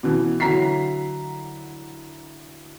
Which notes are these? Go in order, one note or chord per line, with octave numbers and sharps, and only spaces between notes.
B2 E3
D3 F#3 E4 A#5 B6 C7